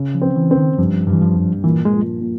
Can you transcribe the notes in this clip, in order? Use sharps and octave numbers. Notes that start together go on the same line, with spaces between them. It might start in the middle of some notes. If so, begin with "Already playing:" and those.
Already playing: C#3
F3
C4
E3
C4
D#3
G2 F3
G2
E3
F3
G2
A#2 E3
G#3
F3
A#2